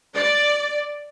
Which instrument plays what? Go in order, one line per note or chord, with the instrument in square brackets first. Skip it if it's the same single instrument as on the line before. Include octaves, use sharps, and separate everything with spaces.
[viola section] D5